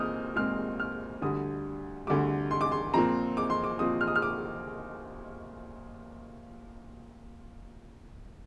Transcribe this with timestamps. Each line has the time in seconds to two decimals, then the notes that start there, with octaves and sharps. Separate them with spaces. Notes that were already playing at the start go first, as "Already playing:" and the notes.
Already playing: A#2 C4 D#6 F6 G6
0.36 A#2 G#3 C4 F6
0.80 F6
1.22 D2 D3 G3 D#6
2.07 D2 D3 G3 D6
2.51 C6
2.61 D6
2.72 C6
2.94 A#2 F3 C4 A#5
3.37 D6
3.50 C6
3.64 D6
3.79 A#2 F3 C4 D#6
4.01 F6
4.07 D#6
4.16 F6
4.22 D6